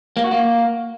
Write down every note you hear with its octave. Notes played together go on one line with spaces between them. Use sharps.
A#3
F#4
A#3